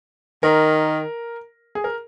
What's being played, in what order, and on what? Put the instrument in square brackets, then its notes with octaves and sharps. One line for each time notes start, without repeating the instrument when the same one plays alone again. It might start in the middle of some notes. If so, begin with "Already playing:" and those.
[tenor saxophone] D#3 [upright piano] A#4
[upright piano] G#4
A#4